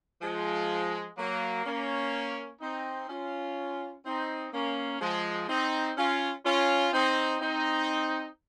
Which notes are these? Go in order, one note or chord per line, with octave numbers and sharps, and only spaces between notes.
F3 G#3
F#3 A#3
A#3 C#4
C4 D#4
C#4 F4
C4 D#4
A#3 C#4
F3 G#3
C4 D#4
C#4 F4
C#4 F4
C4 D#4
C4 D#4